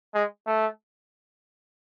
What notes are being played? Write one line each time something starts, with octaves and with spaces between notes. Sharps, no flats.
G#3
A3